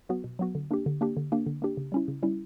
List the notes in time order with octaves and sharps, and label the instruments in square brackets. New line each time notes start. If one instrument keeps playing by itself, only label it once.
[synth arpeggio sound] F#3 B3 F#4
B2
F#3 B3 F#4
D3
A#3 D4 G4
D3
A#3 D4 G4
D3
A#3 D4 G4
D3
A#3 D4 G4
C#3
G3 C#4 E4
C#3
G3 C#4 E4